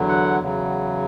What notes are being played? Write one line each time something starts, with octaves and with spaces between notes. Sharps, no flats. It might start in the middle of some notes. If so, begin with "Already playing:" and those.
Already playing: E2 D3 F#3
F#5
E2 C#3 F#3